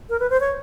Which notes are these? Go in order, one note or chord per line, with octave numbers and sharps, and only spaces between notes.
A#4
B4
C5
C#5